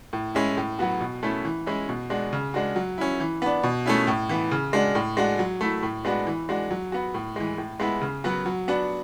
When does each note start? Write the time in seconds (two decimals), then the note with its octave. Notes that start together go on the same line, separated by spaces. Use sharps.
0.13 A2
0.35 G#3 C#4 E4
0.57 A2
0.79 F#3 B3 F#4
1.00 B2
1.23 A3 C#4 E4
1.45 E3
1.66 G#3 C#4 E4
1.89 B2
2.10 G#3 D4 F#4
2.33 C#3
2.54 G#3 D4 F#4
2.76 F#3
2.98 C#4 E4
3.20 E3
3.42 B3 D4
3.63 B2
3.86 A3 C#4 E4
4.07 A2
4.29 E3 B3
4.51 C#3
4.73 G#3 D4 F#4
4.95 A2
5.17 G#3 D4 F#4
5.39 F#3
5.61 A3 E4
5.83 A2
6.05 G#3 B3 D4 F#4
6.27 E3
6.49 G#3 D4 F#4
6.71 F#3
6.92 B3 F#4
7.14 A2
7.36 E3 G#3
7.58 A2
7.80 G#3 B3 E4
8.01 C#3
8.24 F#3 B3 F#4
8.46 F#3
8.68 B3 D4 F#4